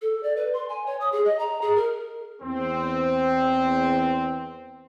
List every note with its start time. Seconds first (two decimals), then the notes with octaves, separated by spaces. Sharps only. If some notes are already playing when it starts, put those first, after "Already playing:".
0.02 A4
0.23 D5
0.36 B4
0.54 C6
0.69 G#5
0.86 C#5
1.00 D#6
1.12 G#4
1.25 D#5
1.39 A#5
1.62 G#4
1.76 A#4
2.42 E2 C4